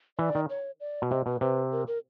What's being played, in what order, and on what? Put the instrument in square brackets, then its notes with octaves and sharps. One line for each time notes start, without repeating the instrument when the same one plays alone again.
[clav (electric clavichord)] E3 [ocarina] D5
[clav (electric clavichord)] D#3
[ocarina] C#5
D5
[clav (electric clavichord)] B2
[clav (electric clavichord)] C3 [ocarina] D#5
[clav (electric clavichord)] B2 [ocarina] B4
[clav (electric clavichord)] C3 [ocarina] B4
[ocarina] A#4
A#4